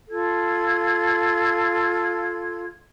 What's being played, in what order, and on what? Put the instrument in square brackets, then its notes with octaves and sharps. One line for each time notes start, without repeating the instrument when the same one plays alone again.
[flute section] F4 A4 G#6